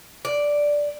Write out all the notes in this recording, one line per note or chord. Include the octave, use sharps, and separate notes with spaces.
D5